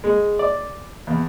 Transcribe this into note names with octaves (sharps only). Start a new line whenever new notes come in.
G#3
D5
E2